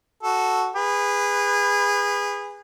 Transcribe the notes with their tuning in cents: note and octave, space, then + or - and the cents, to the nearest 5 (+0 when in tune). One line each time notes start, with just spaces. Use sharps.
F#4 +0 A4 +0
G#4 -25 B4 +0